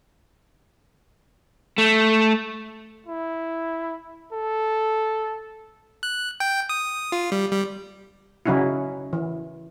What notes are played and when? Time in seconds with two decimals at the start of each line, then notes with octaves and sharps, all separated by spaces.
1.78 A3
3.07 E4
4.33 A4
6.03 F#6
6.40 G5
6.69 D#6
7.12 F4
7.32 G3
7.51 G3
8.46 C#3 F#3 C#4 D#4 E4
9.13 E3